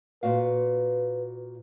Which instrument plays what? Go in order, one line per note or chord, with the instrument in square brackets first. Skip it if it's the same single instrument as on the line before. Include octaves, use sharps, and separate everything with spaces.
[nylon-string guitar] A#2 F#4 F5 [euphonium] B4